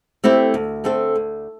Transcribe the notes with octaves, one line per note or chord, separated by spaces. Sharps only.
A3 C4 E4 G4
D2
D3 A3 C4 A4
D2